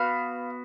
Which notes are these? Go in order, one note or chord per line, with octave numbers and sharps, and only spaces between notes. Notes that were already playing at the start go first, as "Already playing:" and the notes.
Already playing: B3 F#4 F5